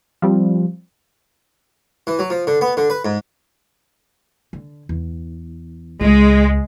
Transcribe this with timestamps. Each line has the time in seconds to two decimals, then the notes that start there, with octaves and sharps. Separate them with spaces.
0.22 F3 G3 C4
2.07 E3
2.19 F#3
2.30 F3
2.47 D3
2.61 B3
2.77 D3
2.90 B4
3.05 G#2
4.53 D3
4.89 E2
6.01 C#2 G#3